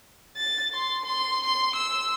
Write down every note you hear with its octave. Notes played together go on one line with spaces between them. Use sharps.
A6
C6
C6
C6
E6